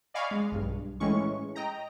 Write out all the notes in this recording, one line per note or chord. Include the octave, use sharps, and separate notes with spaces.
D5 D#5 F5 G#5 B5 C#6
G#3
B1 G2
A2 E3 G#3 C#4 C#6
D#5 G5 A#5